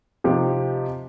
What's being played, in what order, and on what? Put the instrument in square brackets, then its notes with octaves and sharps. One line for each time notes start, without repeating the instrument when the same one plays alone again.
[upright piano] C3 F3 D#4 G4